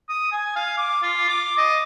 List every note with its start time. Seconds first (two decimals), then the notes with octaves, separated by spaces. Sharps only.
0.09 D#6
0.32 G#5
0.56 F5
0.77 D6
1.03 F4
1.28 D6
1.58 D#5